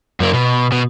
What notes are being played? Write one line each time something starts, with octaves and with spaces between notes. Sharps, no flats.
F#2 A#3
B2
B2